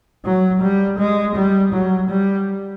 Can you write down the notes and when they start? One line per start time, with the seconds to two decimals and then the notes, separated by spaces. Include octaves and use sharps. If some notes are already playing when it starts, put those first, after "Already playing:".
0.25 F#3
0.62 G3
0.99 G#3
1.36 G3
1.73 F#3
2.09 G3